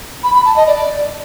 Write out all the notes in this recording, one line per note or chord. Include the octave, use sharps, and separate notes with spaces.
B5
B5
A5
D#5
D5